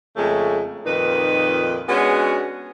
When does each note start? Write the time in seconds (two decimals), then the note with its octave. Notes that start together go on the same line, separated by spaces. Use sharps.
0.16 F2 C#3 G#3 A3
0.85 F2 A#2 D#3 D#4 B4
1.88 G#3 B3 C#4 D4 F#4